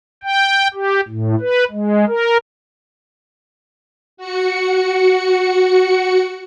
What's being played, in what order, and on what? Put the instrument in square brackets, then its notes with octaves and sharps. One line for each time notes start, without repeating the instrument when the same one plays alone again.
[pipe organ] G5
G4
A2
B4
G#3
A#4
[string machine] F#4 C#7